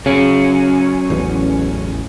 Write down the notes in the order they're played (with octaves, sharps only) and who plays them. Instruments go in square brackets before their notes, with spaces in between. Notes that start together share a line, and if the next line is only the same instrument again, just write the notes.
[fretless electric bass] C#3 [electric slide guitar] F#3 C#4
[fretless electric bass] A1 E2